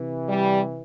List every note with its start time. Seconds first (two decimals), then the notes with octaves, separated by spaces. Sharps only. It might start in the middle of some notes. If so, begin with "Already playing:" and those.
Already playing: C3 E3
0.27 G3